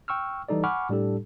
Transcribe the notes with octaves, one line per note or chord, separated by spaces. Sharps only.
G5 C#6 E6 F6
E3 G3 D#4 A4 D5
F#5 G#5 B5 C#6 D6 F6
A2 G3 D4 G4 A4